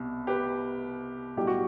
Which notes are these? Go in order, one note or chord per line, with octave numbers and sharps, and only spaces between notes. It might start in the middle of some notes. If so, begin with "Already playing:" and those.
Already playing: C2 B2
G4 B4
B1 A2 G3 G4
F#4